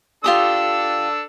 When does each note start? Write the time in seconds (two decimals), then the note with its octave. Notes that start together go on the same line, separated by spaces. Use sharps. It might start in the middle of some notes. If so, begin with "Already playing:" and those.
0.24 D4 F4 G4 A4 D#6 E6